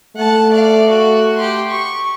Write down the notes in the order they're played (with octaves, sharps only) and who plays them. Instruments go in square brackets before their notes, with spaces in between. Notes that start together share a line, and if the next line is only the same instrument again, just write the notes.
[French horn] A3 [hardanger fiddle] F#5 A5
[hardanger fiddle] D5 F5
F#4
G4 C6
C#6